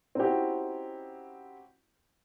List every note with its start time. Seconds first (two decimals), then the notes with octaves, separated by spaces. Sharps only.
0.15 C4 C#4 D#4 E4 F#4 G4